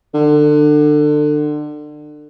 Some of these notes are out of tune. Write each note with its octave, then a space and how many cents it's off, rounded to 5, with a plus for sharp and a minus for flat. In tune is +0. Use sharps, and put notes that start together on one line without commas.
D3 +25